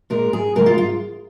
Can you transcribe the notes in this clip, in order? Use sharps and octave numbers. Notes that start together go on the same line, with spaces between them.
A#2 G#3 A#4
G#4
C#3 G#3 A#4
F4
F4